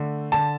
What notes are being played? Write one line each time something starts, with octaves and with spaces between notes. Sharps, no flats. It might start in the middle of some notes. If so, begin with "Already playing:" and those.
Already playing: D3 A3
D3 A5